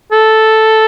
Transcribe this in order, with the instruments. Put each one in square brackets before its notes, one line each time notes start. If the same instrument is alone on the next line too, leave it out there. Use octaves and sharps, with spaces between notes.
[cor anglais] A4